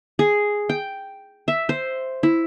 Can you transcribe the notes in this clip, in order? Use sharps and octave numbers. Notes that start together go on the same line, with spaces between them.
G#4
G5
E5
C5
E4